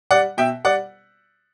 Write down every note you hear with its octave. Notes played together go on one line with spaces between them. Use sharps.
G3 D5 F#5
B2 E5 G5
G3 D5 F#5